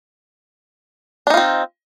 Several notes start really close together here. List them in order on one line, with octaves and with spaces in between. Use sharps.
D4 D#4 F4 C4